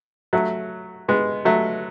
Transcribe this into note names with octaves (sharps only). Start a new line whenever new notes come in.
F#3 A3
G#3 B3
F#3 A3